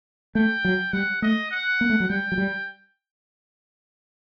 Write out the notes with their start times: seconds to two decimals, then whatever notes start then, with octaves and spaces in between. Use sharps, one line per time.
0.35 A3 G5
0.65 F#3
0.93 G3 F#5
1.22 A3 D#5
1.51 F#5
1.81 A#3
1.90 A3
2.00 F#3
2.09 G3 G5
2.32 F#3
2.38 G3